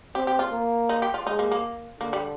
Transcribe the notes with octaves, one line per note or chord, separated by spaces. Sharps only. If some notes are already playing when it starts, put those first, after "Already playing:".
C4 G4
G4
F4
A#3
D#4
G4
F4
G#3 D#4
A#3
A#3
D3 A#3
G3